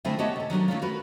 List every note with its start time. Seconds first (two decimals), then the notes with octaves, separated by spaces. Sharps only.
0.05 D3 G#3 A3 C4 E4 F4
0.19 B3 C#4 G4 C#5 D#5 A5
0.36 C3 A4
0.50 D#3 F#3 C#4 D4
0.68 D#3 A3 C#4 F4
0.82 F#4 A#4 B4